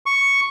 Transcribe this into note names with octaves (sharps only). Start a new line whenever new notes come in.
C#6